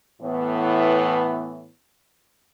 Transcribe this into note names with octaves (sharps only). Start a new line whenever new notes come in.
A2 E3 B3